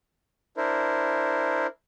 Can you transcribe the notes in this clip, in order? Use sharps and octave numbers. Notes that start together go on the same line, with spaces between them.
D4 E4 A#4 C5